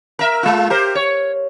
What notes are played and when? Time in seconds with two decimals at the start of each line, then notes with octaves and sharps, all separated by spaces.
0.19 A#4 E5
0.43 G#3 F4
0.70 G4 A#4 C5
0.95 C#5